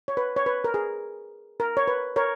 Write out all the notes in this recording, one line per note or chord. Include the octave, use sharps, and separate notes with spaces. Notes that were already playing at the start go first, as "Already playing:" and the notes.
C#5
B4
C#5
B4
A#4
G#4
A#4
C#5
B4
A#4 C#5